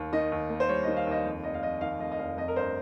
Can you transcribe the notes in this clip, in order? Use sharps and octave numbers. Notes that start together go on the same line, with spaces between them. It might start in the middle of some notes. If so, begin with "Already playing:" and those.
Already playing: D#2
D#3 D#5
D#2
A#3
C5
G3 C#5
D#3 D#5
F5
D#2 D#5
F2
F1 D#5
F5
F1 D#5
D#3 F5
F2 D#5
D#5
F1 F5
F2 D#5
A#4
G1 C5